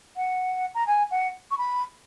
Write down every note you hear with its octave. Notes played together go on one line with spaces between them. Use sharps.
F#5
A#5
G#5
F#5
C#6
B5